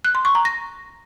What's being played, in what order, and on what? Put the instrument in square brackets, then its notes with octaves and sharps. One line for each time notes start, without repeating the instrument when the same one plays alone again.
[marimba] F#6
C6
C#6
A#5
A#6